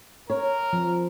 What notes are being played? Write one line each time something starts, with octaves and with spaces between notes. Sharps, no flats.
A#4 C#5
F3